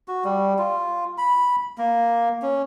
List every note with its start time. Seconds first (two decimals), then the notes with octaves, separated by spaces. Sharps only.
0.08 F#4
0.24 G3
0.59 F4
1.18 B5
1.78 A#3
2.42 C#4